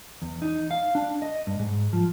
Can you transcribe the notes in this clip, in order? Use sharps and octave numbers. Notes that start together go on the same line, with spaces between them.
E2
D#4
F5
D4
D#5
G2
G#2
F3